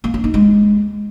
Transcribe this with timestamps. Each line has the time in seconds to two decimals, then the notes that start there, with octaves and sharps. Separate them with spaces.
0.04 A#3
0.14 C#4
0.24 D#4
0.34 G#3